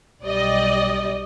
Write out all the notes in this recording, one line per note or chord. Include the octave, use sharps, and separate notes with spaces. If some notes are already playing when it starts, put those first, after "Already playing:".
B1 G3 D5 D#5